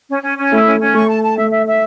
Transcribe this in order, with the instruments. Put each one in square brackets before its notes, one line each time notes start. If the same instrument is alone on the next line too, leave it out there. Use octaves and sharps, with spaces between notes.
[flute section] C#4
C#4
C#4
[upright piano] A3 [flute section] E4
[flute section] C#4
C#4
[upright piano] A3 [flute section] C#6
[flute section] A5
A5
[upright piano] A3 [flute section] E5
[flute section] E5
E5